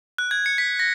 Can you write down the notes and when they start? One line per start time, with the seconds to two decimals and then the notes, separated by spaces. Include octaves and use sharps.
0.18 F#6
0.31 G#6
0.46 C#7
0.58 B6
0.79 A#6